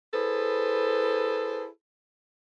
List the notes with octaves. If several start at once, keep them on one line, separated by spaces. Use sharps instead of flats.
E4 G#4 A4 B4 C5